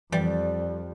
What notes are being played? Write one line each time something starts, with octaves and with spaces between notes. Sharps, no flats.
F2 E3 G3